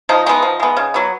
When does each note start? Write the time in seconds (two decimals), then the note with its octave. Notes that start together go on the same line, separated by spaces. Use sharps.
0.09 F3 D#4
0.26 G#3 B3 D#4
0.43 F3
0.60 G#3 B3
0.77 C#3
0.94 F#3 B3